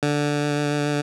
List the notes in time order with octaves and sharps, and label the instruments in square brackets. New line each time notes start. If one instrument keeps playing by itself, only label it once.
[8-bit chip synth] D3